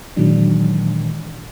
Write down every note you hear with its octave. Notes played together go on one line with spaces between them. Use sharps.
A#2 D#3 E3 F#3 G#3 D4